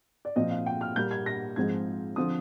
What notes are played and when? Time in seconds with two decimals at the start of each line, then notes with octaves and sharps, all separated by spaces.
0.25 D5
0.36 A#2 F3 C4 D#5
0.51 F5
0.66 G5
0.81 F6
0.96 A#2 G3 A#3 G6
1.11 G#6
1.26 A#6
1.56 G#2 F3 G#3 C4 G#6
2.16 D3 F3 C4 D#6